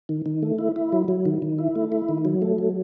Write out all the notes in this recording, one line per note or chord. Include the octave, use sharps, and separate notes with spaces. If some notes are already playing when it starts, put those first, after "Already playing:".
D#3
D#3
A3
E4
E4
F#3
F#3
D#3
D#3
E4
A3
E4
D#3
F#3
A3
F#3